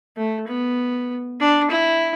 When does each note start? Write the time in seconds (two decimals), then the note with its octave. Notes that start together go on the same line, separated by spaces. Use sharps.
0.17 A3
0.47 B3
1.40 D4
1.71 E4